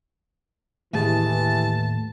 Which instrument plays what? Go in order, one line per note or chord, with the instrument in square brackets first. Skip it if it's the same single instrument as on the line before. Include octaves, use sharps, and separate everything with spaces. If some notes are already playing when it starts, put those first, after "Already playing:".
[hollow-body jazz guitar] D#2 A2 G#4 [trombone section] E3 [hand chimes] A3 G4 [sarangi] A5